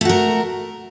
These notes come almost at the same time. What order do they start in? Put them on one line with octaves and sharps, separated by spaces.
A3 F#4 A#4